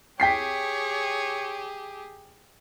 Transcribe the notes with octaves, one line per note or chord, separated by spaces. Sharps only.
G4 G#4 C#5 G5 B6 C7